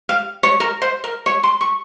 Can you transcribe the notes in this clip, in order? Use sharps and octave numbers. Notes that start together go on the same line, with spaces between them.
F5
C#5
A#4
C5
A#4
C#5
C6
C#6